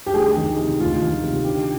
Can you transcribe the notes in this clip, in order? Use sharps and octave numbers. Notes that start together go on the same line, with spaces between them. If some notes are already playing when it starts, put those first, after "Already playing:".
G4
D2 G#4
D#3
C3
D2 F4
D#3
C3
D3 G4